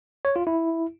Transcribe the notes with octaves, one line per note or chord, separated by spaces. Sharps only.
C#5
F4
E4